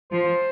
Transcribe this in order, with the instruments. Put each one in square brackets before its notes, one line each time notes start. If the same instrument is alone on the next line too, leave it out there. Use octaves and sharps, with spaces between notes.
[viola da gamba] F3 [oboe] C5